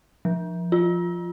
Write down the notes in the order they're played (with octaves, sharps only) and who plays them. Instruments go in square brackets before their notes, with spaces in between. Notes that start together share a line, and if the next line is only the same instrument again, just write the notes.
[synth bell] F3
F4